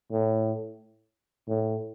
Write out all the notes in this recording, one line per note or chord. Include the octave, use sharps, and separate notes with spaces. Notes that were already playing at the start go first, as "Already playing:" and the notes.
A2
A2